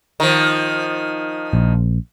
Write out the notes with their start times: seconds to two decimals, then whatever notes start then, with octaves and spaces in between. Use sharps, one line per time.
0.20 D#3 F3
1.53 A#1